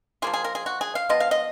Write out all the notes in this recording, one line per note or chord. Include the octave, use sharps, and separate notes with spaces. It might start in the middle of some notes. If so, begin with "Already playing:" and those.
F3 A#3 F4 G#4
G#4
A#4
G#4
F#4
G#4
F5
F3 B3 F4 D#5
F5
D#5